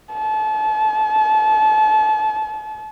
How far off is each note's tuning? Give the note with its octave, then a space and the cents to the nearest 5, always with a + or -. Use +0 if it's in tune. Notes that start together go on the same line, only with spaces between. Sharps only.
A5 -35